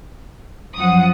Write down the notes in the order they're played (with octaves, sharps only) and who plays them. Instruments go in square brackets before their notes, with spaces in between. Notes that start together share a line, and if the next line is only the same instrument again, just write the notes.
[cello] F#2 F3 [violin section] F#5 D#6